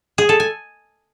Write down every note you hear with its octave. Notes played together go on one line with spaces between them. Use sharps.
G#4
A4
G#5